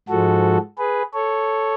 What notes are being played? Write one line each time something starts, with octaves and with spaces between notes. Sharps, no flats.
G#2 F3 G#3 F#4 A4
G#4 B4
A4 C#5